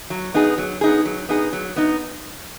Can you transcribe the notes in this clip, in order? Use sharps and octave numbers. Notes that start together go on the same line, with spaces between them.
F#3
B3 D#4 G#4
F#3
B3 D#4 G#4
F#3
B3 D#4 G#4
F#3
B3 D#4